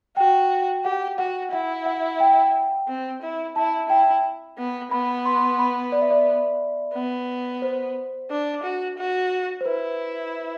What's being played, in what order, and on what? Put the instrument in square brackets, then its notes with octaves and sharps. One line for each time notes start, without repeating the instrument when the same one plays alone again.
[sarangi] F#4 [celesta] G5
[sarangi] G4 [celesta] F#5
[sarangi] F#4 [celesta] F#5
[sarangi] E4 [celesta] F#5
[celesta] F#5
G5
[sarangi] C4
E4
[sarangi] E4 [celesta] A5
[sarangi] E4 [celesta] G5
[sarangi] B3
[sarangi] B3 [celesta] B5
[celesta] C6
B5
D5
E5
D5
[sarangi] B3
[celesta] C5
[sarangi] D4
F#4
F#4
[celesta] C5
[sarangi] E4 [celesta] B4